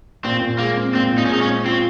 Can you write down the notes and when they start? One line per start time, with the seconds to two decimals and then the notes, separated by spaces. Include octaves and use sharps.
0.24 A#2 C4
0.41 A#2
0.59 G#3 A#3
0.76 C4
0.95 A#2 C4
1.12 A#2
1.18 D#4
1.25 C#4
1.30 G#3 D#4
1.41 C#4
1.47 C4
1.65 C4 F4